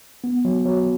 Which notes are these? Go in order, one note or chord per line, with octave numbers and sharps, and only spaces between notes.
B3
F#3
F#3